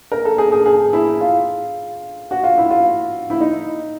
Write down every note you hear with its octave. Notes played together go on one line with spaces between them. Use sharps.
A#4
A4
G#4
G#4
G#4
E4
F4
F#4
F4
E4
F4
E4
D#4